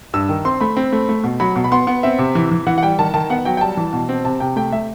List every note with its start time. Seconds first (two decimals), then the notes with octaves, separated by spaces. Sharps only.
0.14 G2 E6
0.29 D#3
0.45 C4 C6
0.61 A3 B5
0.77 C4
0.92 A3
1.09 A3
1.24 B2
1.40 F#3 B5
1.56 B2
1.64 B5
1.72 B3 C6
1.87 B3
2.03 C4 E5
2.19 C3
2.35 E3
2.51 E3
2.67 E3 F#5
2.78 F#5
2.83 G3 G5
2.99 D#3 A5
3.14 D#3 A5
3.30 B3 F#5
3.45 F#3 G5
3.57 G5
3.61 G3 A5
3.77 E3
3.93 B2
4.09 C4
4.25 C3 A5
4.40 C3 G5
4.56 A3 G5
4.72 A3 E5